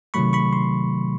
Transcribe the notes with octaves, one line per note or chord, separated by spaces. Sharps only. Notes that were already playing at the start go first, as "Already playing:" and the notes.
C3 D#3 F#3 A3 B5 C#6
B5 C#6
C6